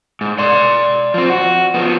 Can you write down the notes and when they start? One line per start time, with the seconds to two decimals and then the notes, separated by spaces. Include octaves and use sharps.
0.21 G#2
0.38 D5 C6
1.14 F3 C4
1.30 F#4
1.74 F3 B3